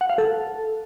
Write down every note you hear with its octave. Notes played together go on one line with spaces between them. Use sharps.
F#5
F5
A4